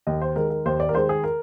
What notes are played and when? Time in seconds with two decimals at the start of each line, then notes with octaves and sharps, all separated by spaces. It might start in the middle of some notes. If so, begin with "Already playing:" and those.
0.07 D#2 D#5
0.22 C5
0.36 D#3 G#3 A#4
0.50 A#4
0.65 D#2 C5
0.80 D5
0.89 A#4
0.95 D#3 G#3 C5
1.09 G#4
1.24 A#4